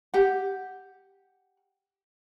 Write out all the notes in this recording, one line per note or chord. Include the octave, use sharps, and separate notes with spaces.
G4 F#5